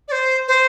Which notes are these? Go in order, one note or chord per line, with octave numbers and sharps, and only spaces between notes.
D5
C5
C5